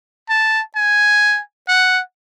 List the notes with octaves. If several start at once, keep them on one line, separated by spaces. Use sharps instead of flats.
A5
G#5
F#5